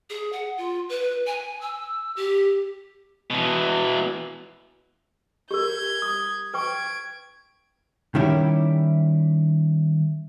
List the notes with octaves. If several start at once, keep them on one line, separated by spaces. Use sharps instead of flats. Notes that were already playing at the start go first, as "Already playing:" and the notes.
G#4
F#5
F4
B4
G#5
E6
G4
B2 E3
G4 A#4 G6 G#6
D#6
B4 G5 C#6 G#6 D7
D#3 G3 C#4 E4 G4